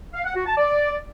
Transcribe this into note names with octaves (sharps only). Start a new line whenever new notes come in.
F5
F#5
F#4
A5
D5